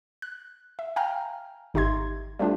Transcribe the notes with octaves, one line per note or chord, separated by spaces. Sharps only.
F#6
E5
F5 G5 G#5 A#5 F6
G#1 D#4 G4 E5 C6 G#6
G3 A3 C4 D4 F4 G4